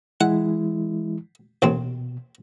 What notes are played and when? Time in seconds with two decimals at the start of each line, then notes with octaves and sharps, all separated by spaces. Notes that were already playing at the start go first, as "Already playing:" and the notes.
0.21 E3 G#3 E4 F#5
1.62 A1 D#2 B2 C4